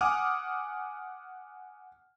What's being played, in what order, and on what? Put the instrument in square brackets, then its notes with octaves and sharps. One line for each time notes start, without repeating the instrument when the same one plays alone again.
[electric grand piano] F#5 G#5 D6 D#6 F6